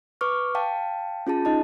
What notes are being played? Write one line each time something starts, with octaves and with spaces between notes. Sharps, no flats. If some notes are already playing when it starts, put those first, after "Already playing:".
B4 C#6 D6 F6
F5 G5 A5
C#4 F4 G#4 A5
D#4 D#5 A5